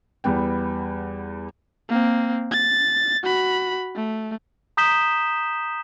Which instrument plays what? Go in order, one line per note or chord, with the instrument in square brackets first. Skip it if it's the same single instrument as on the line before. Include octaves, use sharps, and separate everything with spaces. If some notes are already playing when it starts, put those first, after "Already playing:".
[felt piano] E2 G3 B3 G5
[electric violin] A#3 C4
A6
F#4 B5
A3
[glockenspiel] A#5 D#6 G6 B6 E7 G7